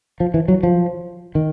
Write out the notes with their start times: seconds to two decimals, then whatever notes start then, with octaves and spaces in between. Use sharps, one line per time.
0.20 F3
0.34 E3
0.48 F#3
0.63 F3
1.35 D#3